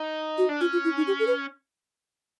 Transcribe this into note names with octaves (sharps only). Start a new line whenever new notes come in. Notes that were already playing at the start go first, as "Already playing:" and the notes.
Already playing: D#4
F#4
D4
C#4 F4
F4
E4
D#4
G4
A4
B4